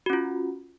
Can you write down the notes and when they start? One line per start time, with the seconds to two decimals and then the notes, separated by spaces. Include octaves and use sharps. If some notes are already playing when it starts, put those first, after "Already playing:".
0.06 F#4
0.10 C#4
0.13 F4